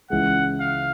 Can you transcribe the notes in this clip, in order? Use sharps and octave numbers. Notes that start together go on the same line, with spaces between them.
C#2 C#3 E3 G#3 F#5
F5